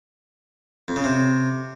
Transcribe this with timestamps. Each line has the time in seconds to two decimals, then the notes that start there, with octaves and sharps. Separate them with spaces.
0.88 F2
0.96 C#3
1.04 C3